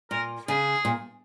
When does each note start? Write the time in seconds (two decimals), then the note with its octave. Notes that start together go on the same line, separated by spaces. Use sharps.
0.11 A#2 A#4
0.48 C#3 G#4
0.85 A#2